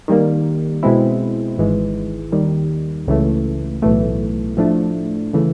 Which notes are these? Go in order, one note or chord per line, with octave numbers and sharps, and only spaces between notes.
D#3 G3 A#3
B2 G#3 C4 E4
G#1 G#2 E3 G#3
D#2 D#3 G3
C#2 C#3 E3 A3
B1 A2 E3 A3
A2 F3 A3 D4
C#3 E3 A3